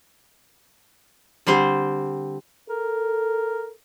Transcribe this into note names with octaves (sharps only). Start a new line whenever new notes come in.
D3 G3 C4 C5
A4 A#4